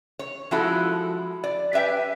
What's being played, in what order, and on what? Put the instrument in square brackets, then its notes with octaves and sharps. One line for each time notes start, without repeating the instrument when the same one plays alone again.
[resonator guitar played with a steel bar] C#5
F3 G#3 E4 F#4 A4
D5
G4 B4 E5 G5 G#5